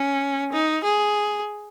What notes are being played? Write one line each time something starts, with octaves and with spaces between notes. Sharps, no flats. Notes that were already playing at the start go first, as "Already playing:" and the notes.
Already playing: C#4
D#4
G#4